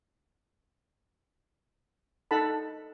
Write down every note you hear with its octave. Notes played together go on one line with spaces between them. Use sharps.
D#4 A4 F#5 A5 B5